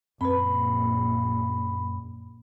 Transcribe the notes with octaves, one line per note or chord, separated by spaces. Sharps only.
A#1 F#2 C4 B4 B5